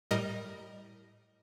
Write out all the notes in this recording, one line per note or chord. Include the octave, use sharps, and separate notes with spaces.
A2 G3 A#4 D#5